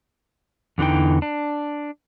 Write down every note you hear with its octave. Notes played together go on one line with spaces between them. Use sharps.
E2 D3 E3 D#4 G5
D4